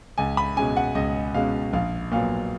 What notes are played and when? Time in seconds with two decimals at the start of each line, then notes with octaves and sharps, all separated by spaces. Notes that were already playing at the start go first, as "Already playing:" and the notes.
0.18 C#2 G#5
0.37 B5
0.56 B2 G#3 C#4 G#5
0.77 F#5
0.95 C#2 D#5
1.34 B2 G#3 C#4 F5
1.73 A#1 F5
2.12 A#2 F#3 B3 F5